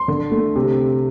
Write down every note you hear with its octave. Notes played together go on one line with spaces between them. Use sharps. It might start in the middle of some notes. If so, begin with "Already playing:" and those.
Already playing: C6
D3
A3
C3